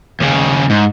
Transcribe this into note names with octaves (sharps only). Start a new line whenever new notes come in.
D#2 C#3
G#2